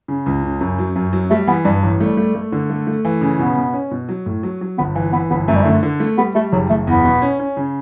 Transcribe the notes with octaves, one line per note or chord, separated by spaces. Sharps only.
C#3
C#2
C#3
F#2
F#3
F#2
F#3
G3 A3
E3 B3
G2 G3
A1 F#3
G3 A3
A3
A3
D3
A3
A3
E3
C#3
B2 B3
B2
C#4
B2
F#3
A2
F#3
F#3
G1 B3
E3
E3 B3
G1 B3
F#2 A3
G3
D3 A3
D3
A3
G3 B3
G3 A3
F#1 F#3
F#1 A3
E2 B3
B2
C#4
C#4
C#3